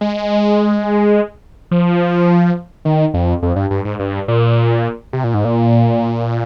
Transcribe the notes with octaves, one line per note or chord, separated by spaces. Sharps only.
G#3
F3
D#3
F2
F2
G2
G2
G#2
G2
A#2
C3
A#2
G#2
A#2